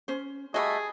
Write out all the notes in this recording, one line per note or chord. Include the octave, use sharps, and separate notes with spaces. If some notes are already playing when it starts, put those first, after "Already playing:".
C#4 C5
G3 A3 F#4 G#4 D#5